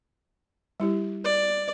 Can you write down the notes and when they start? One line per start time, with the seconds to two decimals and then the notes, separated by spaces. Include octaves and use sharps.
0.80 G3 E4 G4
1.25 D5